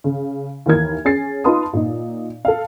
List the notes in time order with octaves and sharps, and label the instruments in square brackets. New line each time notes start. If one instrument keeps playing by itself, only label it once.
[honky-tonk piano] C#3
D#2 E3 A#4 G#6
C#4 G#4 A6 C7
D#4 F4 B4 A5 C6 D#6
A#2 D#4
A4 F5